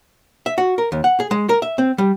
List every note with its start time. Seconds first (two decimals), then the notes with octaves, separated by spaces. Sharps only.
0.46 E5
0.58 F#4
0.78 A#4
0.92 D#2
1.04 F#5
1.20 G#4
1.31 G#3
1.49 A#4
1.62 E5
1.78 C4
1.98 G3